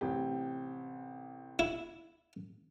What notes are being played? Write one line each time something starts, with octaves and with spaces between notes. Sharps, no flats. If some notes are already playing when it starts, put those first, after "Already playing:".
A1 C3 G4
E4